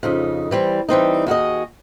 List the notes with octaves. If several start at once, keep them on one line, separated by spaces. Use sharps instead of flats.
F2 C#3 D#4
E3 G3 C4
E3 G3 C4 D#4
D#2 F#4 G#4 D#5